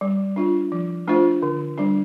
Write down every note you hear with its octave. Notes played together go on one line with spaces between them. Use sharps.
G3
D4 F4
F3
A3 D4 F4 C5
D3
G3 D4